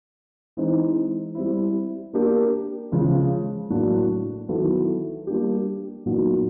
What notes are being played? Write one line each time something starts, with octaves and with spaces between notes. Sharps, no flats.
E3 G#3 C4 D#4
G3 C4 E4
A#3 D4 G4 A#4
C#3 F3 G#3
A2 F#3 A#3 D4 F#4
D#3 F#3 B3 E4 A4
G3 A#3 D4 G4
A#2 F#3 B3 D#4